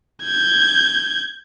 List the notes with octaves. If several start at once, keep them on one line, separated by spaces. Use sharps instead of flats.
G6 G#6